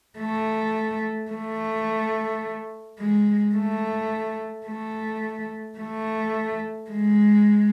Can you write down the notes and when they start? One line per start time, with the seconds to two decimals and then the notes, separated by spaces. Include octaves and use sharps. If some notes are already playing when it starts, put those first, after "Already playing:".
0.19 A3
1.32 A3
3.00 G#3
3.56 A3
4.67 A3
5.79 A3
6.91 G#3